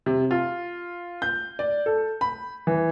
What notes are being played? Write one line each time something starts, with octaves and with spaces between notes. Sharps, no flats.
C3
F4
G6
D5
A4
B5
E3